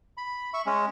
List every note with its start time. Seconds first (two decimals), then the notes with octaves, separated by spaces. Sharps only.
0.17 B5
0.54 E5 C#6
0.66 G#3 C#4